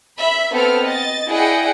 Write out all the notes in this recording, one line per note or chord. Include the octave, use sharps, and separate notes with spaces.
E5 B5
B3 C4 A4 F6
D#5 A6
E4 G#4 D5 D#5 F#5 G5